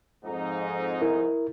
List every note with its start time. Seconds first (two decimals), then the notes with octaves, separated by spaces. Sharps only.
0.25 F2 G#2 D#4
1.02 E4 A#4